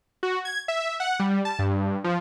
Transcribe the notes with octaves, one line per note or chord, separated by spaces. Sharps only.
F#4
G#6
E5
F#5
G3
A5
G2
F3